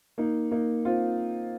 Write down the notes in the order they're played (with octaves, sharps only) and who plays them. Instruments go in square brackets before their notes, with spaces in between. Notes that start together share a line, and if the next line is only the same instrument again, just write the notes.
[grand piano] A#3 D#4
A#3 D#4
C4 F4